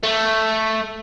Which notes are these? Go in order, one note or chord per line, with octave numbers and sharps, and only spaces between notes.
A3